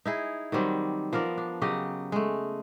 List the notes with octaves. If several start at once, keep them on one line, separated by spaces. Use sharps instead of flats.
D#4 E4 G#4
D#3 F#3 G3 C4
F3 B3 A#4 D5
D4
C#3 F#3 G4 D#5
G#3 A3